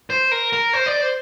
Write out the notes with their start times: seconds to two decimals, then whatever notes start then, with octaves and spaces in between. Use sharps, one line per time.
0.10 C5
0.31 A#4
0.53 A#4
0.73 C5
0.86 D5
1.01 C5